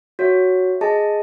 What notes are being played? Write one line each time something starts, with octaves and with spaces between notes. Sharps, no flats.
F#4 C#5 E5
G#4 D#5 A5